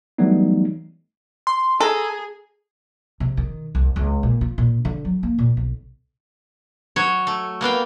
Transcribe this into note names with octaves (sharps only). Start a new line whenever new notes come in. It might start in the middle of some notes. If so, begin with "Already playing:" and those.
E3 F#3 G3 A3 B3 D#4
C6
G#4 A4 A#5
C3
D#3
C2
C#2
A#2
F4
A#2
D3
F#3
A#3
A#2
B1
F#3 C#5
A3
A#3 B3 F5 G5